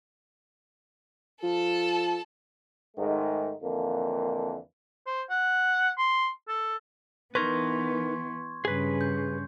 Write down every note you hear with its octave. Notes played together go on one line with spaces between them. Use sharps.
F3 A4 A5
G#2 D#3 G#3 A3 D#4
F2 D3 E3 A#3
C5
F#5
C6
A4
E3 B3 D#4 A#4 B4 C6 C#6 G#6
G2 C#3 G#4 B4
G6